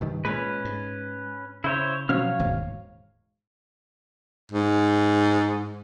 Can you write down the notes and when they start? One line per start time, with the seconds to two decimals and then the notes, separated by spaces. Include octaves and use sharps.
0.01 C2 G2 D#3
0.25 A#2 G#3 C#4 B4
0.65 G#2
1.64 C#3 E4 C5 C#5
2.09 B2 F3 F#3 C#4 C#5 F5 F6
2.39 E1 D#2 G#2 B2
4.51 G#2